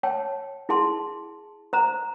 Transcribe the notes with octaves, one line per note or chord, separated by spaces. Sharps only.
C#5 G5 A5
E4 G#4 A5 C6
C5 A#5